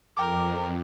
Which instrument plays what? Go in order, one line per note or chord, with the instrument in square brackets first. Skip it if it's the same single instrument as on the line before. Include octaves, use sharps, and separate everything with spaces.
[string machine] F2 [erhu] A#4 [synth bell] G5 D6